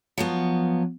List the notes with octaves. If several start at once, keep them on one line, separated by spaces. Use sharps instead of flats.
F3 F#3 B3